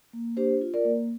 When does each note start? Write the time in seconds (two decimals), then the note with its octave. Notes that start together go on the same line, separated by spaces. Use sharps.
0.13 A#3
0.37 D4 G4 C5
0.61 F4
0.74 A#4 D5
0.85 A#3